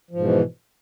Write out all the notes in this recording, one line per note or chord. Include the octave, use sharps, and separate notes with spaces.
G#2 B2 E3 F3